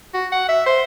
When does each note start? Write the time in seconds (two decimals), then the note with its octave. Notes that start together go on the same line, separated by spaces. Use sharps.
0.14 F#4
0.32 F#5
0.49 E5
0.66 C5